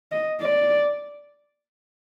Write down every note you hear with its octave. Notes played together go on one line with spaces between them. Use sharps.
D#5
D5